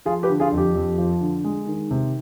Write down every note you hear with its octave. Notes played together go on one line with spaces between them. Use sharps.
F3 F4 G#4
G4 B4
D3
F4 G#4
F2
G4
F2
F3
D3
G#3
D#3
C3